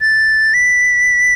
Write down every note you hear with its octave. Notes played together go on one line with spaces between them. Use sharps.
A6
B6